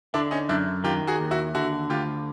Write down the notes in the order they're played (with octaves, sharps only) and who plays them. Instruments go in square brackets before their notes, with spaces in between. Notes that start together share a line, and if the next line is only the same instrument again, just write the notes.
[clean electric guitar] D3 [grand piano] D4 E4
[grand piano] C#4 D#4
[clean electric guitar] F#2 [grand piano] D4 E4
[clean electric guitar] D#3 [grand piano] F4 G4
[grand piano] F#4 G#4
[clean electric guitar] D#2
[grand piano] E4 F#4
[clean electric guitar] D3 [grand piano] E4 F#4
[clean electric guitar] D2 [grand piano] F4 G4